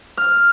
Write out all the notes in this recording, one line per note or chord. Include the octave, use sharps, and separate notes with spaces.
F6